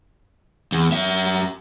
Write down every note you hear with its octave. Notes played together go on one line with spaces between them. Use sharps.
E2
F#2 E5